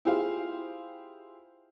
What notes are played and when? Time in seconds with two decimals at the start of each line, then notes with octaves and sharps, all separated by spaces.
0.05 E4 F4 G4 G#4 C5 F5